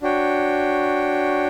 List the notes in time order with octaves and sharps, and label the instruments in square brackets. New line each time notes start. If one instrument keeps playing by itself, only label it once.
[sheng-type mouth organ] D4 F#4 C#5 G5